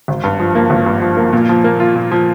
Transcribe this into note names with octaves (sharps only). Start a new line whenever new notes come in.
G#1
G2
F3
A#3
G#1
G2
F3
A#3
A#2
F3
A#3
F4
A#2
F3